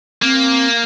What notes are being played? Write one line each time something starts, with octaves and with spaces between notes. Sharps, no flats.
A#3 C4